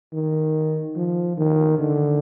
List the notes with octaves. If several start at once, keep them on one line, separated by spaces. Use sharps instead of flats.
D#3
F3
D#3
D3